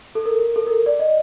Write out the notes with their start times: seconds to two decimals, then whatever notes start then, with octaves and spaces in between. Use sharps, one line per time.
0.15 A4
0.26 A#4
0.56 A4
0.67 A#4
0.86 D5
0.99 D#5